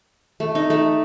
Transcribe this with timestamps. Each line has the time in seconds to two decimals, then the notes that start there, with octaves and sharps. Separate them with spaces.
0.40 A3
0.55 D#4
0.70 A3